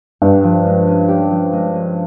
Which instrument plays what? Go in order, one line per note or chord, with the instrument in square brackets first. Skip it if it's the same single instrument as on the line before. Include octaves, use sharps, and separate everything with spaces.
[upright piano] G2 [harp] G4
[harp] F3
G#3
C#4
G4
F3
G#3
C#4